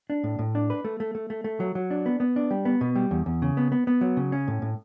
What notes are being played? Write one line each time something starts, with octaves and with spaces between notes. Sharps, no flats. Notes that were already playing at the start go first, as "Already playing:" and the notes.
D4
A2
A2
D4
B4
A3
A3
A3
A3
A3
F#3
F#3
D4
B3
B3
D4
G3
B3
B2
G3
E2
E2
C#3
B3
B3
B3
F#3
C#3
C#4
A2
A2